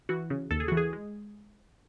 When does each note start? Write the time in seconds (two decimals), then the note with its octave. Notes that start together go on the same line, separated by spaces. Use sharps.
0.09 E3 F#4
0.30 C#3
0.51 D#2 A4
0.60 G#4
0.68 E3 F#4
0.77 G#4
0.93 G#3